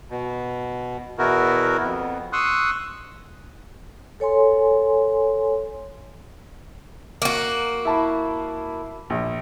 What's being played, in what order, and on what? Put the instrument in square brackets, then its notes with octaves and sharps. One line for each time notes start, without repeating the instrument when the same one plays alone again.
[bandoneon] B2
E2 B2 B3 E4 F#4 A#4
F2 B3
C6 C#6 D#6 E6 F#6
[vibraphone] A4 C#5 G#5 C6
[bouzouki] A#3 F#4
[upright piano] E4 A5 B5
A#1